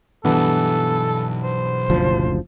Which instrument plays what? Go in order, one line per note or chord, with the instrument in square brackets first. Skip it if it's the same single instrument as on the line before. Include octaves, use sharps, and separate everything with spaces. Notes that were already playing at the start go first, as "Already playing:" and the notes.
[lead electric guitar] B1 [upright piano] G2 E3 B3 [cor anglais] A4
[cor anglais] C5
[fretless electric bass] F#1 D2 F3